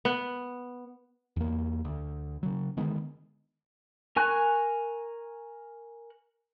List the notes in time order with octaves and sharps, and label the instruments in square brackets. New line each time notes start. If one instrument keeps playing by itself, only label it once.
[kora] B3
[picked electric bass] E2 A#3
D2
C#3 F#3
D3 D#3 G#3 B3
[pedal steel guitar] A#4 G#5 C#6 F#6